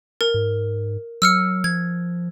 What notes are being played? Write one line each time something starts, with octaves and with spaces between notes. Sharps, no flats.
A#4
G#2
F#3 E6 F6 C#7
F3 G#6